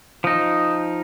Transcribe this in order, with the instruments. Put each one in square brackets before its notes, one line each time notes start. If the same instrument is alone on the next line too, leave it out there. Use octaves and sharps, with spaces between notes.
[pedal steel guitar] F3 D#4 [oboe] D#6